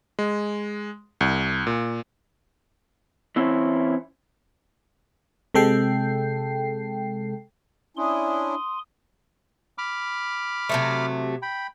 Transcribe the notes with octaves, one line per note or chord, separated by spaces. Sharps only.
G#3
C2
A#2
E3 C4 C#4 E4
C3 G#3 A4 G5 C7
C#4 D4 E4 C6 D#6
B5 D6 F6
C3 F#3 A3
G5 B5